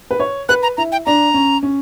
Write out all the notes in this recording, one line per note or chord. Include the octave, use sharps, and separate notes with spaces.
B4
C#5
B4 F#6
A#5
E4 A#5
G5
D4 A#5
C#4
C#4